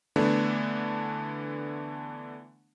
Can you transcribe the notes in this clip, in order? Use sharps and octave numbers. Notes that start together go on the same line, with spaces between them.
D3 E3 A3 B3 D4